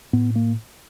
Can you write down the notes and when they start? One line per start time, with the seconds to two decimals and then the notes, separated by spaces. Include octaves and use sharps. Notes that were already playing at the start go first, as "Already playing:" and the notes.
0.13 A2 B3
0.36 A#3